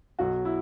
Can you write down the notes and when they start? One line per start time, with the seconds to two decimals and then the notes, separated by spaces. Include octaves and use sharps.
0.19 B1 B2 F#3 F#4
0.45 E4